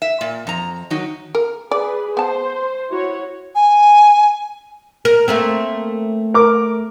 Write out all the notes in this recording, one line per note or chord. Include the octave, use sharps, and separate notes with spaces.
E5
A#2
F2 A#5
D#3 F#3 D#4
A#4
G#4 B4 D5
B3 C5 A5
E4 F#4 C#5
G#5
A#4
A3 A#3 C4
A#4 D6